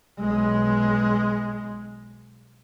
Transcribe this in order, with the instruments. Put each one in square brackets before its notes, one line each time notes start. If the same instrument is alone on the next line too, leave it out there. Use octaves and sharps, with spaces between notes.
[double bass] B1 G#3